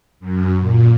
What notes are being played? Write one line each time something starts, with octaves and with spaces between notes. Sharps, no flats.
F#2
A#2